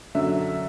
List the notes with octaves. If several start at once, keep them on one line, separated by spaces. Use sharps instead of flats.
F#2 D3 F#3 E5